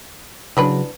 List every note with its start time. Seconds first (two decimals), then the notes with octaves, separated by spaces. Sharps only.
0.57 C#3 E3 F#3 D4 B4